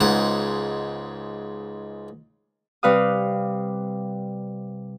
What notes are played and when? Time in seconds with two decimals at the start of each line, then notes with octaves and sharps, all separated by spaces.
0.01 C#2 G#2 F#5
2.83 C3 G3 B4 F5 D#6